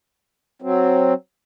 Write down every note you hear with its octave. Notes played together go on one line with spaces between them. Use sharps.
F#3 C4